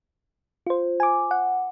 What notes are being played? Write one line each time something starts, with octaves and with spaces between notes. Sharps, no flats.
F4 C5
G#5 D6
F#5